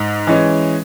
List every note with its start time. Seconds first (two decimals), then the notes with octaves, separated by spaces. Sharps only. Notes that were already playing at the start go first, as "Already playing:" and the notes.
Already playing: G#2
0.27 E3 G#3 C#4